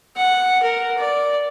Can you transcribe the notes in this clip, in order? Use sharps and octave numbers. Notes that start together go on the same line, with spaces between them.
F#5
A#4
D5